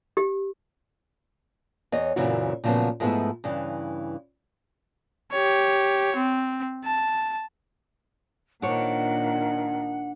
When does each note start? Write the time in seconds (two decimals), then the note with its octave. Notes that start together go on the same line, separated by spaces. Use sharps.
0.17 G4
1.92 E2 C#5 D#5
2.16 F#2 A#2 C#3 E3 C4 F#4
2.64 A#2 C#3 F3 F#3 A3 B3
3.00 G#2 F3 G#3 A3 B3 E4
3.44 G2 C#3 E3
5.32 G4 C#5
6.16 C4
6.85 A5
8.62 A#2 D#3 D4 C5 C#5 F#5